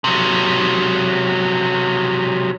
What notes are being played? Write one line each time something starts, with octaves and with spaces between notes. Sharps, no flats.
C3 F#3